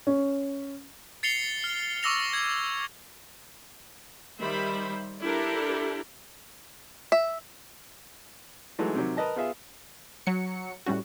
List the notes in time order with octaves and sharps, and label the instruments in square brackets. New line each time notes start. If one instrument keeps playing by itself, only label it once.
[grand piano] C#4
[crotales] A6 C7 C#7 F7 G7
F6 G7
C#6 D6 E6 A#6 F7
G#6
[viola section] D#3 G3 C5 E5 B5
D4 E4 G4 A4 A#4
[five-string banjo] E5
[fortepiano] E3 F#3 G#3 A3 D#4
C3 D#3 F#3
A#4 B4 D#5 A5
B3 F4 G#4 E5
[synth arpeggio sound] F#3 C#7
A2 G3 C#4 F#4